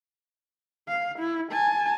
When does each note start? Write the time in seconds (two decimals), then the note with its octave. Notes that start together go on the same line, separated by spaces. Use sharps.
0.89 F5
1.19 E4
1.52 G#5 A5